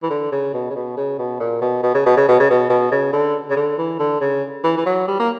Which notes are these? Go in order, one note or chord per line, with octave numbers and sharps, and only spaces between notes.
E3
D3
C#3
B2
C#3
B2
C#3
B2
A#2
B2
B2
C#3
B2
C#3
B2
C#3
B2
B2
C#3
D3
C#3
D3
E3
D3
C#3
E3
E3
F#3
G3
A#3